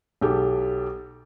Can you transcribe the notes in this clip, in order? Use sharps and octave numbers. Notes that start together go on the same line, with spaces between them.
B1 G4 A4